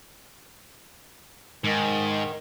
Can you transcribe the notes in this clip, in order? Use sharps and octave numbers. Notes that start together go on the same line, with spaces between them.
G#2 D#3